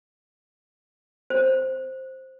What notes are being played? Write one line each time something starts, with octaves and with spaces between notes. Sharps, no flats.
C5